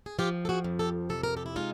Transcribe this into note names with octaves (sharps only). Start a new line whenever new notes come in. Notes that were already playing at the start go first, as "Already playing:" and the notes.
G#4
F3 F4 G4
A4
F#4 G#4
F2
G4 A4
C3 A4
A#4
G4 A4
E4
G#3 D#4 F4